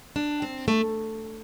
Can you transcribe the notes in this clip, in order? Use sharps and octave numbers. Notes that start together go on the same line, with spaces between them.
D4
C4
A3